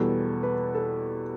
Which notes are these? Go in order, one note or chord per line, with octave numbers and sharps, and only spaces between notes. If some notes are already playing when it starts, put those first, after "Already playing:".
Already playing: E2 B2 G3 A4
B4
A4